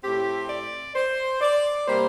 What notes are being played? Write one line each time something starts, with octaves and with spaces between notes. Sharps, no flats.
A2 A3 C4 G4
D5
C5
D5
C3 G3 A#3 C5